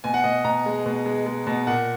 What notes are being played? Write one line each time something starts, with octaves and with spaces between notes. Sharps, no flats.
B2 G#5
F#5
B2 D#5
B2 A#5
G#3
B2
G#3
G#3
B2
A#2 F#5